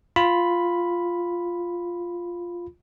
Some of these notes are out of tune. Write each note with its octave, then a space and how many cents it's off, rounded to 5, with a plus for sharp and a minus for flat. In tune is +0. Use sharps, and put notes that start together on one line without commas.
F4 +0 B5 +0